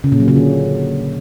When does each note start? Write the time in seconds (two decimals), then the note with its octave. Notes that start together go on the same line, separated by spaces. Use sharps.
0.04 C#3
0.12 A#2
0.20 F#3
0.28 C#3
0.36 D3